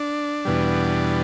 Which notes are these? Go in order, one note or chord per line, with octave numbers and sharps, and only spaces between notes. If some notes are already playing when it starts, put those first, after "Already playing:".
Already playing: D4
E2 B2 G3